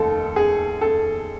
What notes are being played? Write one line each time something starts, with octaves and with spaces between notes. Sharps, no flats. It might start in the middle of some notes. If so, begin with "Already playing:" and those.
Already playing: F1 D#2 A4
G#4
A4